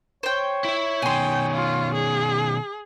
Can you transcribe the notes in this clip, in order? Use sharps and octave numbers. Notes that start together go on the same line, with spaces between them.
C5 C#5 G5
E4 E5
B2 D#3 G5 G#5 C6
F4
G#4